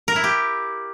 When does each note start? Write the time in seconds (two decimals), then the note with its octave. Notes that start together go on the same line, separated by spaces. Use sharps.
0.08 A#4
0.16 E4
0.24 G4